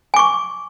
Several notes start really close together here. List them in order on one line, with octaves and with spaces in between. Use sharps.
G#5 D6 C#6